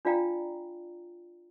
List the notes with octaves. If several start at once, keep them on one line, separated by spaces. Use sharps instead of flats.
D4 F4 D5 F5 G5 A#5